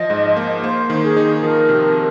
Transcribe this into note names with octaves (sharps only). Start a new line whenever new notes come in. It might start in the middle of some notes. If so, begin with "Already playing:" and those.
Already playing: F3 D#5
G#2
A#3
A#3 C5
D#3
G#4
D#4
F3 A#4
C3